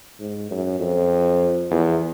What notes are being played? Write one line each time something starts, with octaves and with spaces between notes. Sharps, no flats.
G#2
F#2
F2
E2